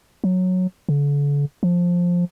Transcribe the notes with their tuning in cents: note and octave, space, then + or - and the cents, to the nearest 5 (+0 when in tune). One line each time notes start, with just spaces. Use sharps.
F#3 -10
D3 -40
F3 +10